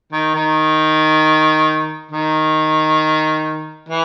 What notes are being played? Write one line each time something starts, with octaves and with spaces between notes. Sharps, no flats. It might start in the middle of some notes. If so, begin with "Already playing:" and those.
D#3
D#3
D#3
E3